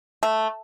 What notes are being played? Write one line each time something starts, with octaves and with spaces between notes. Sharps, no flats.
A3